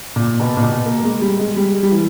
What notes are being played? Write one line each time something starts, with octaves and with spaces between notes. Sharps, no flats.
A#2
B2
A#2
B2
A#3
G#3
G3
G#3
G3
G3
E3